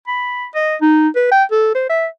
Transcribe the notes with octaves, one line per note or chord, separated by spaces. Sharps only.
B5
D#5
D#4
B4
G5
A4
C5
E5